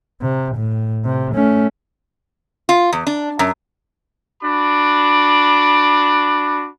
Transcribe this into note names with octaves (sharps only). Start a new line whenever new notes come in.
C3
A2
C3
A3 C#4
F4
E2
D4
F#2
D4 F#4 B5 D6